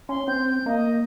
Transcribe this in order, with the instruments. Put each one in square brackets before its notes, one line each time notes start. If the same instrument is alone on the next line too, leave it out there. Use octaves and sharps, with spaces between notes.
[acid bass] C#4 [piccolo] C6
[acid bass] C4 [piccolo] G6
[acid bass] A#3 [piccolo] D#5